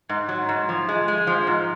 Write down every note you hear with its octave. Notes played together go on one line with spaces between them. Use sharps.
G#2
F#3
G#2
F3
G#3
G#3
F3
G#2